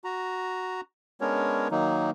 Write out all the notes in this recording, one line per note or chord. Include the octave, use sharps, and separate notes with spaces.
F#4 A#5
G#3 B3 C#4 D4 A#4 C#5
D#3 F#3 A#3 D#4